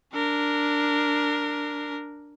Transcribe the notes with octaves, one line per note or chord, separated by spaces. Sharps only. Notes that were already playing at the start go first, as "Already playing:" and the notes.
D4 A#4